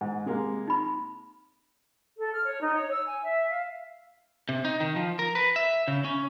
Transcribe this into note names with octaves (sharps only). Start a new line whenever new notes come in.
G#2
C3 G#3 A#3
D#4 B5
A4
F6
C#5
D#4
C#5
E6
G#5
E5
F5
C3
D#4
D#3
F3
A#4
B4
E5
C#3
C#4